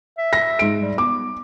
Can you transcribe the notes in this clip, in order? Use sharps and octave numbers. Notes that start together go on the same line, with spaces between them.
E5
A#6
G#2 D7
G3
B3 D6